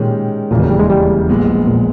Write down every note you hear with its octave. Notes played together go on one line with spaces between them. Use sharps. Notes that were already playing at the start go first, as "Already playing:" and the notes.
Already playing: A#2 D#3 G#3 C#4 G4
E1 D#2 A#2 C#3 E3 A#3
B2
G3
G#3
G3
A#1 A#2 G#3 B3
A#2